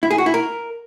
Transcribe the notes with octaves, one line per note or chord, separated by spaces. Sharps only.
E4
G#4
F#4
E4
A#4